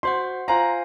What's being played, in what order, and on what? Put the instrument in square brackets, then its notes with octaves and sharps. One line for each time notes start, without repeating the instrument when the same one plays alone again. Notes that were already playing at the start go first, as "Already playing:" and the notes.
[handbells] F#4 C5 F#5 [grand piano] C6
[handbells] F4 C5 F5 G#5 [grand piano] A#5